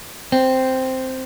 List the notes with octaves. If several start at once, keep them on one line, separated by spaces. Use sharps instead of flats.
C4